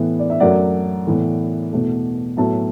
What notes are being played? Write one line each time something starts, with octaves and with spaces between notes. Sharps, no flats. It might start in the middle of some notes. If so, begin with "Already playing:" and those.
Already playing: A2 E3 B3
D5
E5
F#2 F#3 A3 D5 F#5
A2 E3 B3
E2 B2 A3
A2 F#3 B3 E5 A5